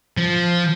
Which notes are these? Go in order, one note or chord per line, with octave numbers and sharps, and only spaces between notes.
F3